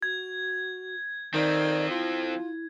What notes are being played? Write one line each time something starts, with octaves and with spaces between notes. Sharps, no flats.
F#4 G#6
D#3 F3 C4 D5
E4 F4